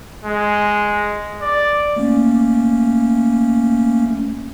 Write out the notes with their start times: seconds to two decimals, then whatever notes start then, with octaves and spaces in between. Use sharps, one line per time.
0.24 G#3
1.42 D5
1.96 A3 A#3 C#4